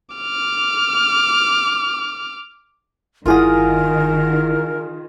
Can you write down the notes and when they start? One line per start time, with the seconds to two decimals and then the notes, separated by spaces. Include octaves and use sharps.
0.15 D6 F6
3.26 G1 D#3 E4 F4 G#4 A#4 F#5 D#6